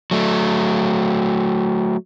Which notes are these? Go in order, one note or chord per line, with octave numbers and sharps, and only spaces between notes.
F#3 A3